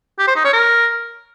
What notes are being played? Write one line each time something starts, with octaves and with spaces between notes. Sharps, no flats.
G4
C5
D#4
C#5
A#4